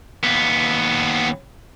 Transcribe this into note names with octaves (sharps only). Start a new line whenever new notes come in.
D#2 B3